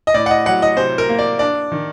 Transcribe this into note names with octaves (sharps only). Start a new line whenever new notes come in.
D#5
A2 D5
F#5
D#5
F#3 F#5
D#5
C3 C5
A#4
A#3
D5
D4 D5
D#3